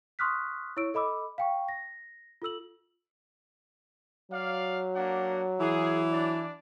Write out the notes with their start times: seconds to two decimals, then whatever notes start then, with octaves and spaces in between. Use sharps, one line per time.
0.19 C6 C#6 D#6 F6 F#6 B6
0.77 E4 C#5 C#6 E6 D7
0.94 A4 D#5 B5 D6 E6
1.38 F5 G5 C#6
1.68 A#6
2.42 F4 A4 E6 F#7
4.32 F#3 D5 F5
4.95 A#3 D4 F#5
5.60 E3 G#4
6.11 D4 D5